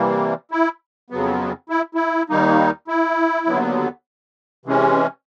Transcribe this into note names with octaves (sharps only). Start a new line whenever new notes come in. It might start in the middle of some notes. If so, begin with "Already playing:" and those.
Already playing: C3 E3 G3 A#3
E4
F2 C#3 F#3 B3
E4
E4
D#2 D#3 G3 A#3 D#4
E4
D#2 D3 F#3 B3
C3 E3 G#3 C#4